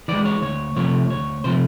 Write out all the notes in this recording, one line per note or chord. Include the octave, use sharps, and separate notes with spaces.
E3 G#3 D5
C#5
D2 C#5
C3 F3 A3 C#5
D2 C#5
C3 F3 A3 C5